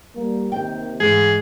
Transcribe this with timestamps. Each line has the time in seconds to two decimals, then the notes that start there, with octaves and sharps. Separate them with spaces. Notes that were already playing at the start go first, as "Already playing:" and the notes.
0.16 G3 A#3
0.52 D#2 C3 D#3 G5
1.00 G#2 E3 G#4